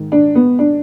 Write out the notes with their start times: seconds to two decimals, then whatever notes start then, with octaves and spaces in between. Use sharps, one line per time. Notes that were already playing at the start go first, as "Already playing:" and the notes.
Already playing: G#2 D#3
0.12 D4
0.35 B3
0.59 D4